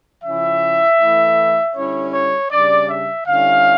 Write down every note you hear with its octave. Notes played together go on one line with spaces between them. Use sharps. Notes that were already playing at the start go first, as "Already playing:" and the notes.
C#3 F3 C#4 E4 E5
E3 A3 E4
D3 G3 C#4 E4 C#5
C#5
C#3 G3 D4 D5
E5
D3 G3 C#4 E4 F5